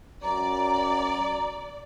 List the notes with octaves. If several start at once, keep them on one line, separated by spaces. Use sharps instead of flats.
F#2 D5 A#5